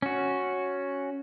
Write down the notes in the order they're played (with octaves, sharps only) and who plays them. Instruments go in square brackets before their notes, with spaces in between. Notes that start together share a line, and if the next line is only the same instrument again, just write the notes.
[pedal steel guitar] C#4 F#4